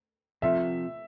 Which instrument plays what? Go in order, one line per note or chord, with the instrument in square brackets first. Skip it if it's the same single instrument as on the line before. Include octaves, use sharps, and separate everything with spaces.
[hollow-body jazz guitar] C3 F3 A3 [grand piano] E5